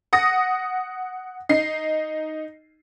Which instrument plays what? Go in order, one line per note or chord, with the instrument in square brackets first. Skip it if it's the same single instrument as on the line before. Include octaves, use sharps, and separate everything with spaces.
[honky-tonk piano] F#5 D#6 A#6
D#4 C7